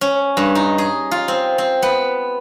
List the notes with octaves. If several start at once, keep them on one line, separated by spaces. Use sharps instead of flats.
C#4
G2
D#4
G#4
F4
C4
C4
B3